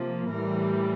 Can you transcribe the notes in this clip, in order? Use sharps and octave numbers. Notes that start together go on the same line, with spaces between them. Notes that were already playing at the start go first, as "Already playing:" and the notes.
Already playing: C3 F3 A#3
A2 E3 G3 A#4